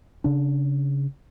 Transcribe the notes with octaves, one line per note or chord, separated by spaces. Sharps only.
C#3 D4